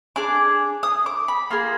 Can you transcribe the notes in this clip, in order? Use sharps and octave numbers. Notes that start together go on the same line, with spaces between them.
D4 G#4 D6
D#6
D6
B5
A#3 F4 G#4